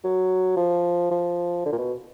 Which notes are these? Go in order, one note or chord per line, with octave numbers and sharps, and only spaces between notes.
F#3
F3
F3
D3
A#2
B2